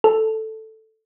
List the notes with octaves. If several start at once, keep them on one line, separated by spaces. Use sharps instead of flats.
A4